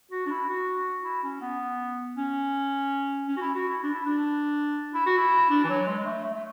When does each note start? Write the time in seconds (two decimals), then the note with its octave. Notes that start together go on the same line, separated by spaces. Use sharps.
0.11 F#4
0.26 D4
0.31 E4
0.49 F#4
1.04 E4
1.23 C#4
1.41 B3
2.17 C#4
3.28 C#4
3.37 F#4
3.41 E4
3.55 F#4
3.69 E4
3.83 D4
3.93 E4
4.05 D4
4.94 E4
5.06 F#4
5.17 E4
5.50 D4
5.64 E3
5.69 F#3
5.87 G#3
5.98 G#3
6.05 A3
6.23 A3
6.34 A3